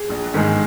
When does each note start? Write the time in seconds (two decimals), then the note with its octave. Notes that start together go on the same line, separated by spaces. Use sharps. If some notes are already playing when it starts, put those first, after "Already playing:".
Already playing: G#4
0.10 A#1
0.34 G#2 D#3 G#3